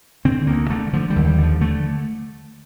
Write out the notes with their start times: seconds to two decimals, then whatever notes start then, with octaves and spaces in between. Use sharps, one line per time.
0.25 D3 C4
0.47 D2 A#3
0.70 D3 A3
0.93 D3 F3
1.10 G3
1.16 D#2
1.27 G3
1.38 D3
1.43 F3
1.61 D3 A3